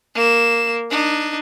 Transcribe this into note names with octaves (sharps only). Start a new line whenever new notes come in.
A#3 E7
D4 D#4